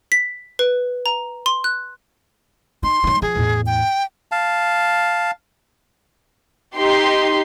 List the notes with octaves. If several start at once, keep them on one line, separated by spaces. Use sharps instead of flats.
B6
B4
A#5
C6
F#6
D#4 C6
F#3 D#4
F3 G#4
E2 A2
G5
F5 A5
D#4 G4 C6